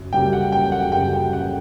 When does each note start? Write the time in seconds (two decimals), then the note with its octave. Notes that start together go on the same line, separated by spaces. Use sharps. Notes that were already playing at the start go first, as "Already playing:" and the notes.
Already playing: F#2 C#3
0.13 F#2 C#3 G3 G5
0.33 F#5
0.52 G5
0.72 F#5
0.92 F#2 C#3 G3 G5
1.13 G5
1.33 F#5